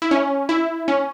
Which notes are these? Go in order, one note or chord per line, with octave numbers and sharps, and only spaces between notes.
E4
C#4
E4
C#4